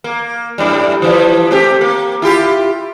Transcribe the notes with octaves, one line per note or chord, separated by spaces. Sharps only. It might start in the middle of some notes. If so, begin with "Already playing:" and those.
A#3
F#2 A2 G3
E3 F3 G3
A3 C4 G4
A#3
E4 F4 G4